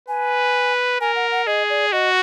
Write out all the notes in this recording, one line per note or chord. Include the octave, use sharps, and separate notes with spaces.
B4 G#5
A#4 G#5
F#5
F#5
G#4 D#5
D5
F#4 D#5